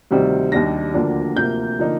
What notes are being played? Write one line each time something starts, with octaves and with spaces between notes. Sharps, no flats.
D2 C3 D#3 G3 C4
D#2 D#3 G3 D4 A#6
D2 D3 F3 A#3 D4
D2 C3 F3 A#3 G6
D3 F3 A#3 D#4